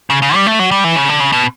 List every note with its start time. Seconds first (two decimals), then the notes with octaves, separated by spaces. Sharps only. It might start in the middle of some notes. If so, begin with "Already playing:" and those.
0.10 C#3
0.22 C#3
0.35 G3
0.47 A3
0.59 F#3
0.71 G3
0.84 E3
0.96 C#3
1.08 D3
1.20 C#3
1.32 B2